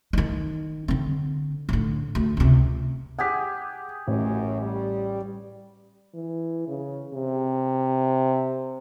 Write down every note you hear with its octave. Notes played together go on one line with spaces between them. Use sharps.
D#3 D#4
D3 C4
A2 D3
D2
C#2 C3
G4 G#4 F#5 B6
A1 F#2
G3
E3
C#3
C3